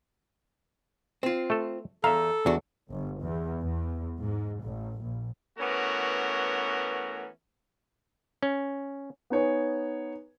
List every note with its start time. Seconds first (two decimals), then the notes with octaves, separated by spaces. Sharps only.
1.23 C4 F4
1.50 A3 A4
2.04 E2 A4 E5 F5 A#5
2.46 E2 D4 F#4
2.91 G1
3.21 E2
3.61 E2
4.20 G#2
4.60 A1
5.01 A#1
5.58 E3 A3 B3 C#4 F#4 A#4
8.42 C#4
9.30 B3 D#4 C#5 G#5